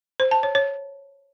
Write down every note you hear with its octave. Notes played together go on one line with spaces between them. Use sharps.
C5
A5
C#5
C#5